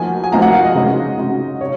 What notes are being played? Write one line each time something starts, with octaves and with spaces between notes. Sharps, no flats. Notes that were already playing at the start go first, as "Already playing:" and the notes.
Already playing: F3 A#3 D#4 F#4 G#5
G#5
F3 A#3 D#4 F#4 A#5
F#5
F5
D#5
C#3 G#3 D#4 F#4
C#3 G#3 D#4 F#4
C3 C#5